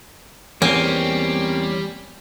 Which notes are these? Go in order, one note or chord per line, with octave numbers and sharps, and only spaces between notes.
E2 G3 A#3 C4 C#4